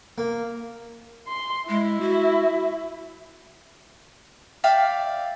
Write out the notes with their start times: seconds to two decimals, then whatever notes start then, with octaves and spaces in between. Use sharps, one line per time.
0.18 A#3
1.28 C6
1.69 G#3 E4
2.01 F#4
4.64 D5 E5 F5 G5